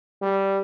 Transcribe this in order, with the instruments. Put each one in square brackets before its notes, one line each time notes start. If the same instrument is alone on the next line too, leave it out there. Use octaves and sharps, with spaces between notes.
[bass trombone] G3